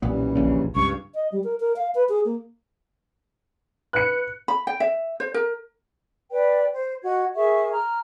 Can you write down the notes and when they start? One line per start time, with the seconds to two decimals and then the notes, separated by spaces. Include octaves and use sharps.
0.02 B1 F#2 A#2 E3 G3 B3
0.35 D#1 A#1 C#3
0.75 C#2 G2 F5 C#6
1.15 D#5
1.32 G3
1.44 A#4
1.60 A#4
1.76 F5
1.95 B4
2.09 G#4
2.25 A#3
3.93 B4 F#6 C#7
4.48 B5
4.67 G5
4.80 E5
5.20 C5
5.34 A#4
6.31 B4 D5 G5
6.72 C5
7.04 F#4 D#5 F#5 G#6
7.35 G#4 A#4 E5 C#6
7.71 A#5 F6